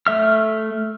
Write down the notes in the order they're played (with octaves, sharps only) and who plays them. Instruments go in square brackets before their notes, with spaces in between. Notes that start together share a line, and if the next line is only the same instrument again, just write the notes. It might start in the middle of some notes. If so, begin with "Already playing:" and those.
[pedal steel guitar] A3 E5 F6